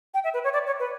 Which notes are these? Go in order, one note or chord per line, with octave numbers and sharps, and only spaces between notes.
G5
E5
B4
C#5
D5
C#5
B4